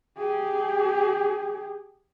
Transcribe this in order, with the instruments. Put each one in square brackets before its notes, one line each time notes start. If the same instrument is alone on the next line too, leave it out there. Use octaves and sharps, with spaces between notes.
[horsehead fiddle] G4 G#4